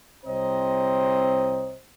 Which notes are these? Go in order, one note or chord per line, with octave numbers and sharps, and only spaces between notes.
C2 C4 C5 C#5 D#5 A#5